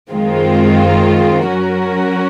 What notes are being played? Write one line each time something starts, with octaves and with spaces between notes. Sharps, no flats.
F#2 D#3 G#3 C4 F4
F#3 C#4 F#4 A#4